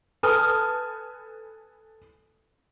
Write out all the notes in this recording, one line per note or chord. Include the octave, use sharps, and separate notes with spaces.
A4 B4 G#5 A5 D#6 F6